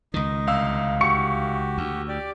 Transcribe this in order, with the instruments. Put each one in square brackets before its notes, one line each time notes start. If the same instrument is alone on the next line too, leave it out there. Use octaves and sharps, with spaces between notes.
[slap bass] C#2 D#3 [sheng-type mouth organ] D#4
[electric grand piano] C2 F5 E6
[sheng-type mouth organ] F#4 G4 [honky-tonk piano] C#6 C#7
[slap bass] D2
[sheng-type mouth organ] G4 D5